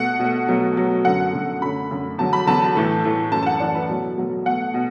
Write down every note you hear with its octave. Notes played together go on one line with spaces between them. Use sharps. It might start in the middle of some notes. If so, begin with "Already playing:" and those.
Already playing: B2 A3 F#5
B2 A3
B2 F#3 A3
B2 F#3 A3
F#2 D3 F#3 A3 F#5
F#2 D3 F#3 A3
F#2 D3 A3 B5
F#2 D3 A3
E2 D3 F#3 A5
B5
E2 D3 F#3 A5
A2 E3 A3
A2 E3 A3
F#2 E3 A3 A5
A5
F#5
F#2 E3 A3 D5
B4
B2 F#3 A3
B2 F#3 A3
B2 A3 F#5
B2